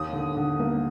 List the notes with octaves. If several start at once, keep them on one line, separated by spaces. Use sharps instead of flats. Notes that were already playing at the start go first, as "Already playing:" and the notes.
Already playing: D#2 D#6
D3
D3
A#3